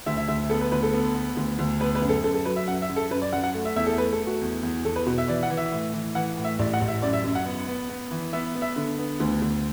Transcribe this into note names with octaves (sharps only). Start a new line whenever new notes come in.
D2 E5
E5
D2 E5
B3 A4
B4
D2 B4
A4
B3
B3
D2
D2
B3 B4
B4
F#2
A4
F#2 A4
A4
F#3 B4
E5
F#2 F#5
E5
F#2
A4
F#2 B4
D5
F#2 F#5
F#5
A3
E5
E2 E5
A4
A3 B4
A4
A3
F#4
E2
E2
E2 A4
B4
B2 F#4
E5
E3 D5
F#5
E3
E5
A2
E3
E3 F#5
A2
E5
A1 D5
F#5
A1
E5
F#2 D5
E5
F#2
F#5
B3
B3
B3
E3
B3 E5
B3
E5
D3
B3
D2
D2